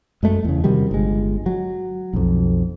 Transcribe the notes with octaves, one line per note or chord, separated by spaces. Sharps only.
F#2 G#3 A3
E2 C#3
C3 D#3 F#3 G3
G1 G#3
F#3
B1 F2